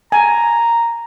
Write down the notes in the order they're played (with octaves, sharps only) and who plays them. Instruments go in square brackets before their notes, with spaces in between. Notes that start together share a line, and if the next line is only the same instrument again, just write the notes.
[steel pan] G#5 [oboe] A#5